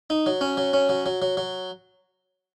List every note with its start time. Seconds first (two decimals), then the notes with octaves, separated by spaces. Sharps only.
0.10 D#4
0.26 F#3
0.41 C#4
0.57 F#3
0.73 C#4
0.89 F#3
1.06 F#3
1.22 F#3
1.37 F#3